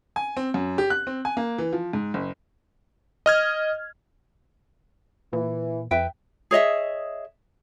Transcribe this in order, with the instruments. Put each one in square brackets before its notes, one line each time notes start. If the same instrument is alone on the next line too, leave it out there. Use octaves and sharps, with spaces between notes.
[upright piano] G#5
C4
F#2
G4
F#6
C4
G#5
A#3
E3
F3
G#2
F#1
[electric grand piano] D#5 F6 G#6
[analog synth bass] A#2 [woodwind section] E3
[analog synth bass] F2 [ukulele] B4 E5 G5
[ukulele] G#4 C#5 D#5 E5